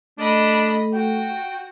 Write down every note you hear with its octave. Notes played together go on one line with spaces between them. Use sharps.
A3 D4 D#5 B5
F#4 G5